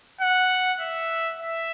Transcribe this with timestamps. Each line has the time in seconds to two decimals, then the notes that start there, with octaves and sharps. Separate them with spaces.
0.21 F#5
0.80 E5
1.39 E5